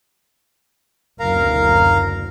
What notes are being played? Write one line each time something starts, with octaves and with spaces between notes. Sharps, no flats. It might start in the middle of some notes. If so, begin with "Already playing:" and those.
F#1 D2 B2 A#4 F5 A#5